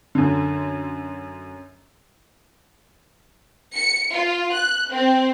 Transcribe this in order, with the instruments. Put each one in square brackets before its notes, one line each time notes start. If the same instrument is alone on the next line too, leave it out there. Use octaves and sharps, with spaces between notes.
[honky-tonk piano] F#2 D3
[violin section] C#7
F4
F#6
C4